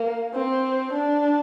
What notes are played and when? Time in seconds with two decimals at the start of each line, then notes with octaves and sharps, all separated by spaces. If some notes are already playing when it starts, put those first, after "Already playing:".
Already playing: A#3
0.34 C4
0.92 D4